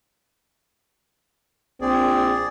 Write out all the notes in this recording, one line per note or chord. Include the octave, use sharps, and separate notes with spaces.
A#1 C4 G#4 D5